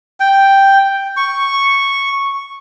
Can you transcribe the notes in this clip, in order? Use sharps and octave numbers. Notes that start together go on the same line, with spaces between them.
G5
C#6